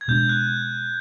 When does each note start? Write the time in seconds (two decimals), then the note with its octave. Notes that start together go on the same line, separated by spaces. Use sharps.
0.01 G#6
0.08 B2 G#3 B3 D4 G6
0.29 F#6